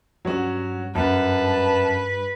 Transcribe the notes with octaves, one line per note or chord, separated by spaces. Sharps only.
G2 F#3 C#4 F#4
F#2 B4 A5